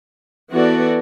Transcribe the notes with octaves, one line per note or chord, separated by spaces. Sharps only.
E3 B3 F#4 A4 D5